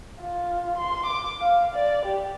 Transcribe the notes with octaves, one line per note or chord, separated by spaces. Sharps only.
F4
C6
D6
F5
D5
G4